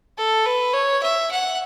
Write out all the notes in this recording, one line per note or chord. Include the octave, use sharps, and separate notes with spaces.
A4
B4
C#5
E5
F#5